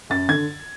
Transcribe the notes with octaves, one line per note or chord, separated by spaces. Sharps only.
F#2 A6
D3 G#6